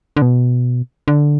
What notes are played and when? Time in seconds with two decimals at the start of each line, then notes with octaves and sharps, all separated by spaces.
0.17 D3
0.22 B2
1.08 D3